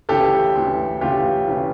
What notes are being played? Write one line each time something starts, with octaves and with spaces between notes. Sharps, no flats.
D2 C#3 E3 G4 A4
D2 C#3 E3
D2 C#3 E3 F4 G4
C#3 E3